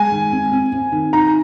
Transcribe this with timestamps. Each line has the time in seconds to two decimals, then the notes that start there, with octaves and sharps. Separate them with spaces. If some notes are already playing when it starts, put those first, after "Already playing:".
Already playing: G#3 G#5
0.11 D#3
0.32 C4
0.52 C4
0.72 C4
0.92 D#3
1.13 D#4 A#5